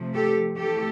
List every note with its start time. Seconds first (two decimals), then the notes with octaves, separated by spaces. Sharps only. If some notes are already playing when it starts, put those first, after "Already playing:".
Already playing: C3 F3 A3
0.15 G4 A4
0.58 C3 E3 A3 G4 A4